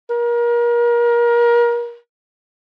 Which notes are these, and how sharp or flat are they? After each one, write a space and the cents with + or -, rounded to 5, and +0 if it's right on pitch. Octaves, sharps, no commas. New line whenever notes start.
A#4 +30